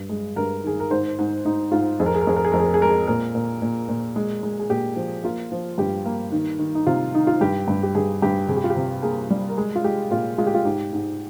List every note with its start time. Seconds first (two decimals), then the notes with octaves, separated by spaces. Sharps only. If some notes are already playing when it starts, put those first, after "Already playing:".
Already playing: G2
0.09 G#3
0.36 G2 A#4
0.64 D#3 G#4
0.80 A#4
0.90 G#2 C5
1.19 G#2
1.45 G#2 D#4
1.72 G#2 F4
1.99 F2 G#4
2.06 A#4
2.15 G#4
2.21 A#4
2.27 F2 G#4
2.36 A#4
2.45 G#4
2.52 F2 A#4
2.60 G#4
2.66 A#4
2.74 G#4
2.81 G#3 A#4
2.89 G#4
3.07 A#2 A#4
3.35 A#2
3.62 A#2
3.89 A#2
4.16 G#3
4.43 G#3
4.59 G#4
4.70 A#2 G4
4.96 F3
5.23 A#3 F4
5.52 F3
5.78 G2 G4
6.05 A#3
6.32 D#3
6.59 D#3
6.75 D#4
6.87 C3 F4
7.14 D#3 D#4
7.27 F4
7.41 G2 G4
7.68 G2
7.83 G4
7.95 G2 G#4
8.22 G2 G4
8.48 C3 G#4
8.57 G4
8.64 F4
8.70 G4
8.76 C3
9.02 A#3 G#4
9.30 G3
9.49 A#4
9.57 G#3 G#4
9.76 F4
9.84 G#3 G4
10.11 A#2 F4
10.38 G#3 F4
10.47 G4
10.54 F4
10.65 G#2 G4
10.93 G#2